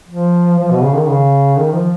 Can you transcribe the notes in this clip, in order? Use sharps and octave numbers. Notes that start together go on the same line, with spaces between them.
F3
F3
B2
C#3
D#3
C#3
D#3
F3